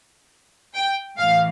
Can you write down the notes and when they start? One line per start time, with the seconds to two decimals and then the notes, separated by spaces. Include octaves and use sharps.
0.75 G5
1.19 A2 E3 F5